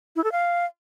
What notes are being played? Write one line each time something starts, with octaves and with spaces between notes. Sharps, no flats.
E4
A4
F5